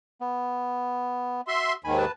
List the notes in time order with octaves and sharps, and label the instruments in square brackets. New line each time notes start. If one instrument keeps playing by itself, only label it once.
[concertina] B3
[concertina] F#4 [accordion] E5 C6
[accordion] D#2 G#2 D#3 [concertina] G#5 B5
[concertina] B4 A5